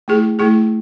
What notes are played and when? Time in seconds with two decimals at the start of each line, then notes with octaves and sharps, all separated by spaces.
0.08 A3 E4 G#4
0.39 A3 E4 G#4